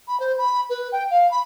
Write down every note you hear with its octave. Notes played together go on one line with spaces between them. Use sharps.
B5
C5
B5
B4
G5
F5
B5